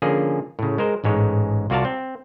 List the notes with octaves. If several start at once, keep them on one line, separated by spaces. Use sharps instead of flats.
D3 F3 A#3 C#4 G#4
A2 C#3
G#3 A#4 C5
A1 G#2 G#3 C#5
C2 F4 F#4 D5 F5 A5
C4